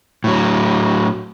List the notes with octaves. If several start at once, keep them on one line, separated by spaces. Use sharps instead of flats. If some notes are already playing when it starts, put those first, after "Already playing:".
A2 F#3